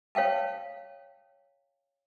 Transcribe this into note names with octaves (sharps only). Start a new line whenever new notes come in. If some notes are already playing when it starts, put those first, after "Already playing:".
C#5 F5 G5 A5